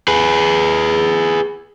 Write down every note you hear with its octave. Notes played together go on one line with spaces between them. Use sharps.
G#4 B4